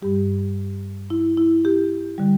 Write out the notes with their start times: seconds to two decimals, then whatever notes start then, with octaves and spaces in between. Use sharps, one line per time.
0.02 G2 G3 G4
1.10 E4
1.37 E4
1.65 G4
2.18 D3 G3